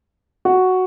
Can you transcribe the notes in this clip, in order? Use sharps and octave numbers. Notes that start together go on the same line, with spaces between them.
F#4